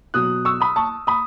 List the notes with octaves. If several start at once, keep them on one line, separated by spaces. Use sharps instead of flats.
B2 F#3 D#6 F#6
C#6 E6
B5 D#6
A5 C#6
B5 D#6